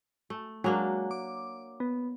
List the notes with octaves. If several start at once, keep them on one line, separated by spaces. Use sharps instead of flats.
A3
F#3 G#3 A#3 D4
D6
B3